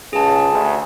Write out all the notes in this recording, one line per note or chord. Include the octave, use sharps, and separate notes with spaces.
C#2 G#4 G#5 A5
D2